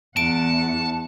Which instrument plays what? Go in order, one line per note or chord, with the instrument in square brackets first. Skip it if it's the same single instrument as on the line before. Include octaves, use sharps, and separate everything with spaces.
[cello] E2 F#5 [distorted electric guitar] A5 [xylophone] D7